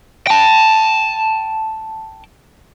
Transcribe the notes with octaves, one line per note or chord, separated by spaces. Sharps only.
G5 A5